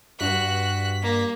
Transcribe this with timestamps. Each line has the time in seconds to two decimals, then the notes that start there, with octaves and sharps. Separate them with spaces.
0.20 G2 F#4 F#6 B6
1.02 A#3